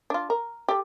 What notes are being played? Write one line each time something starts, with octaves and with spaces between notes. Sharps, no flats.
D4 F4
A#4
G4 A4